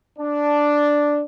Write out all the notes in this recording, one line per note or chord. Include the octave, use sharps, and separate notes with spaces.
D4